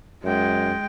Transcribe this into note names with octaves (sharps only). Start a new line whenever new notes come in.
F#2 G#3 G5